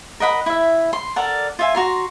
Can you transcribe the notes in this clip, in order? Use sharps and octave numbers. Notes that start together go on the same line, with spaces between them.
A#4 D#5 F#5 B5
E4 E5
C6
A4 A#4 D5 F#5
F4 E5 G#5
F#4 A#5 C6